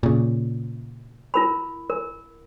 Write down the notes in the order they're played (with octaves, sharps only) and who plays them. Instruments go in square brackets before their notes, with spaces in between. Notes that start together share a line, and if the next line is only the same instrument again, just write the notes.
[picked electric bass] A#2 C#3
[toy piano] E4 A#4 B5
A#4